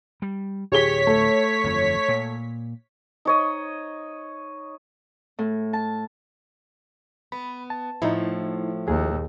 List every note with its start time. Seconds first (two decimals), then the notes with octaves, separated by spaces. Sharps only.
0.22 G3
0.72 D1 G4 G#4 C#5 B6 G7
1.07 A3
1.64 G1 F2 F3
2.08 A#2
3.25 D#4 C#5 D#5
5.39 A2
5.73 A5
7.32 B3 B5
7.70 A5
8.02 A2 F3 A3 D#4 E4
8.88 D#2 G#4